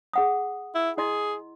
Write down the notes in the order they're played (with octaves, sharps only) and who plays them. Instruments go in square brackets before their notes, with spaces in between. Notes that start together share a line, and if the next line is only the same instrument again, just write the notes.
[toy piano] G#4 F#5 D#6
[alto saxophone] E4
[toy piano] E4 D#5 C6 [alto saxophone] G#4